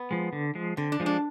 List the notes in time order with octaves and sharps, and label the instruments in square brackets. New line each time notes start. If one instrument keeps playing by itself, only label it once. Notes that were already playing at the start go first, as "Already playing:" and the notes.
Already playing: [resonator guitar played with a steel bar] B3
[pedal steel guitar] F3 G#3
D3
F3 G#3
[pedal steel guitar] D3 [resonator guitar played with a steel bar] C4
[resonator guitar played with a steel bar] D4
[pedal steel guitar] F3 G#3
[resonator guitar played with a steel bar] D4